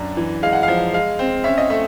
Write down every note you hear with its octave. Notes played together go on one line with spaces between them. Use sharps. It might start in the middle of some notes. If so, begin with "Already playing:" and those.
Already playing: F#2 D4
E3
G#3 F5
F#5
F3 F5
G#3 F5
C4
C#4 E5
D#5
A3 E5